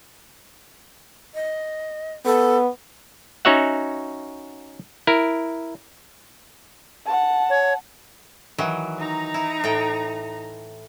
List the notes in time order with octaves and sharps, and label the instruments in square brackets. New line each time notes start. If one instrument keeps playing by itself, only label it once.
[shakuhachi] D#5
[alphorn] B3 [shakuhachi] A4
[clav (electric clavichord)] C#4 D#4 F#4 C#5 E5 F#5
E4 A#4
[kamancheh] F#5 A5
[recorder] C#5
[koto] D#3 E3 F#3
[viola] D#4 A#5
[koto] E4
A2 G5